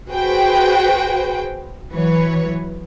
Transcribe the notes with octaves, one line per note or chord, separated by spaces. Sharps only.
F#4 G#4 B4 C5 G5
E3 F#3 B4 C#5